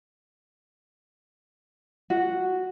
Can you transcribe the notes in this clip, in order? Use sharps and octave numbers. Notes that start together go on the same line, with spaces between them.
F#4